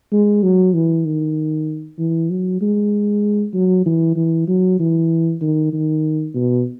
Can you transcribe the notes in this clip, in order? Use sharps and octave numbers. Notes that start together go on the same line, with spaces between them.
G#3
F#3
E3
D#3
E3
F#3
G#3
F#3
E3
E3
F#3
E3
D#3
D#3
B2